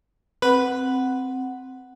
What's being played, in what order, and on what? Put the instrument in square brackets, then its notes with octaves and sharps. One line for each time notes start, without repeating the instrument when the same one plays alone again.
[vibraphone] C4 F#5 [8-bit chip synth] B4